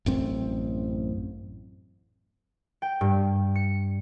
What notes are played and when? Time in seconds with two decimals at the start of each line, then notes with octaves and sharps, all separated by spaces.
0.06 A1 F#2 C4
2.82 G5
3.01 G2
3.55 C#7